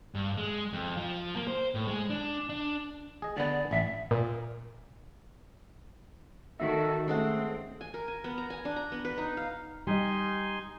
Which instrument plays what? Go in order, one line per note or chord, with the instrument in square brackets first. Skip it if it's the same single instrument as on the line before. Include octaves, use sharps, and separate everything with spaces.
[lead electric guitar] G2
G#3
F2
F3
A#3
C5
A2
G#3
D4
D4
[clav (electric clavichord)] G#4 D#5
[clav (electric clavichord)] D3 B3 [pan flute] D5
[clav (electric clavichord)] A1 [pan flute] E5
[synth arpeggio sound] A#2
[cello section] D#3 F#4 [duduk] A4 [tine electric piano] E5
[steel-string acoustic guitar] G#3 A4 F#5 [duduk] A3 [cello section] C4 [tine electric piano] C#4
[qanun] G#5
A#4
G#5
B3
A#5
G#5
D4
A#5
B3
B4
D#4
F5
[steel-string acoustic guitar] G3 D#5 [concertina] D#4 G#5 C6